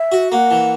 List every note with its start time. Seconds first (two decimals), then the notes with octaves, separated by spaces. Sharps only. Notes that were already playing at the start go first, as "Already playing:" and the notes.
Already playing: E5
0.12 F#4
0.31 A#3 F#5
0.51 E3